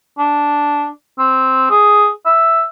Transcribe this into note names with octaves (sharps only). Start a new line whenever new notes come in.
D4
C4
G#4
E5